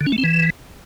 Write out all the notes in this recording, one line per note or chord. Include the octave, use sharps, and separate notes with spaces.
D3
C#4
A3
C4
E3